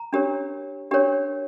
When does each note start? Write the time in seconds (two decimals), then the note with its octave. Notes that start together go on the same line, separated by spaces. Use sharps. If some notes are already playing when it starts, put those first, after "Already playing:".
Already playing: A#5
0.13 D4 G4 A#4 C#5
0.91 D4 G4 A#4 C#5